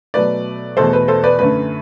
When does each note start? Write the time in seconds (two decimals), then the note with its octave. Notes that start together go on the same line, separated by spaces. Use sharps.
0.14 B2 F#3 A3 B4 D5
0.77 E2 B2 A3 A4 C5
0.93 B4
1.08 A4 C5
1.24 B4 D5
1.39 F#2 D3 A3 B4